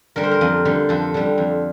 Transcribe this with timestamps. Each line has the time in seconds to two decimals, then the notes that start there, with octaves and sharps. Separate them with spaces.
0.16 D3 G3 A#4
0.23 C5
0.31 A#4
0.41 F2
0.65 D3 G3
0.89 F2 A4
1.14 D3 G3
1.38 F2